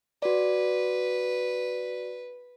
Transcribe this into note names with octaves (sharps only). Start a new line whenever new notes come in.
F#4 B4 D5